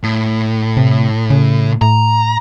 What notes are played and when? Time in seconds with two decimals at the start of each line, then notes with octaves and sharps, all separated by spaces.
0.03 A2
0.77 C3
1.30 C#3
1.82 A2 A#5